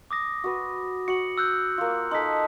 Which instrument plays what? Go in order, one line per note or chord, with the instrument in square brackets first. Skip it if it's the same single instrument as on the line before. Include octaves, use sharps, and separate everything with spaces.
[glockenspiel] D6 D#6 A#6
[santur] F#4 B4
[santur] F#4 [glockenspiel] C#7 F#7
[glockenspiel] E6 F#6 G6
[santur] A#3 F4
[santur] D#4 A4 [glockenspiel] C6 D#6 B6